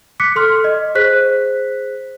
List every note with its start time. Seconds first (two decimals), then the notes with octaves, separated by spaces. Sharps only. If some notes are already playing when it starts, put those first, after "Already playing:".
0.20 D6 F#6 B6 C#7
0.36 A4 C6 F6
0.64 D#5
0.95 G#4 C5 F#6 B6